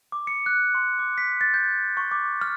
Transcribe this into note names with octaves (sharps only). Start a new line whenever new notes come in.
D6
C#7
F#6
C6
D6
B6
A6
G6
C#6
D6
F6